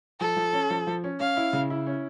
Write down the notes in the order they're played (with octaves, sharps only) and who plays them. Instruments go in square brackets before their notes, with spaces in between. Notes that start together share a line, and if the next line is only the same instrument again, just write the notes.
[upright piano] F3 [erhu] A4
[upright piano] F3
C#4
F3
F3
C#4
[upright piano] C#4 [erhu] F5
[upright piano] E4
C#3
E4
C#4